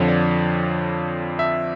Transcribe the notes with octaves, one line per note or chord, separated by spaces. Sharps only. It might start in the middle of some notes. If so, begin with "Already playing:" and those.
Already playing: F2 D3 F3 C#5
D5
E5